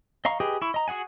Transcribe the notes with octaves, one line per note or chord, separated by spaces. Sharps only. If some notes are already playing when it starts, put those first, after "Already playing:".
D#5 F5 A#5 C#6
G4 G#4 B4 D#5 G5
E4 C#6
D#5 A#5
F#4 G#4 F#5 G#5